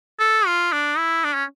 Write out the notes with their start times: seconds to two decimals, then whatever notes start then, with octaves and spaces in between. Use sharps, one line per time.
0.19 A4
0.46 F4
0.72 D4
0.97 E4
1.24 D4
1.34 C#4